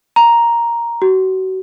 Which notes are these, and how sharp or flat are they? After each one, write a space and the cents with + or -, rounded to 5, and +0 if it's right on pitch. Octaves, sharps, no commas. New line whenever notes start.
A#5 +5
F#4 +30